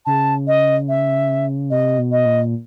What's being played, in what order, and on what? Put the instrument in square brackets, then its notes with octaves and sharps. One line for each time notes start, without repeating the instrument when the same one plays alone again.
[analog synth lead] C#3 [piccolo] A5
[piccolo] D#5
E5
[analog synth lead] C3 [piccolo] D#5
[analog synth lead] B2
[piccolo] D#5
[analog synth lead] A#2